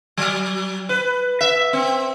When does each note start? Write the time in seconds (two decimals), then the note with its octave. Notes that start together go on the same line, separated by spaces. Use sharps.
0.17 F#3
0.89 B4
1.41 E5
1.73 C4